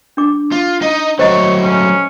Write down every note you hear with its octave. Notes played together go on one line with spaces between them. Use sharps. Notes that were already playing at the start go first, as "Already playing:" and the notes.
D4 D6
F4
D#4 D#5
F#3 A3 C5 C#5 D#5
C#4